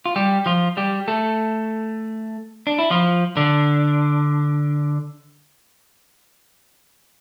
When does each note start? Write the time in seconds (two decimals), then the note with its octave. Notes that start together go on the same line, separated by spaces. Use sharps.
0.06 F4
0.16 G3 G4
0.46 F3 F4
0.77 G3 G4
1.08 A3 A4
2.67 D4
2.79 E4
2.91 F3 F4
3.37 D3 D4